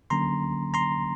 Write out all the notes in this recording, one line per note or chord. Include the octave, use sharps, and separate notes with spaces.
D3 F#3 A#3 C#4 A#5 C6
A#5 C6